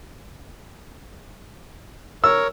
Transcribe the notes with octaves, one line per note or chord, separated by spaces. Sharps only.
A#4 C#5 E6